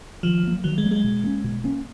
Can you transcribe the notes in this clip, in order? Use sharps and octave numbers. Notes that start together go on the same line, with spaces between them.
D#3 F3
F#3 A#3
D#3 F#3
G#3
F#3 A#3
G#3
B2
A#3 C#4
B2
A#3 C#4